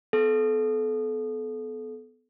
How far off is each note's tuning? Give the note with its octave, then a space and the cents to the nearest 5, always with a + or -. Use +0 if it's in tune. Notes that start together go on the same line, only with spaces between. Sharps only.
B3 +15 A4 -30